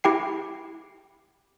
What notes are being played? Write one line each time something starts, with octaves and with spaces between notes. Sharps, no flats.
E4 G4 G5 C7